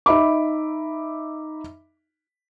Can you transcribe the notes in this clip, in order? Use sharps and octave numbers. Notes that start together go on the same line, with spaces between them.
D#4 E5 B5 D6